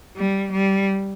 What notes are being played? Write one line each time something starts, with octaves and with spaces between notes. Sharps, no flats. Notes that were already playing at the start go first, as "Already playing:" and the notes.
G3
G3